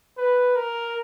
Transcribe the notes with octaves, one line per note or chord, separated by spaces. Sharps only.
B4
A#4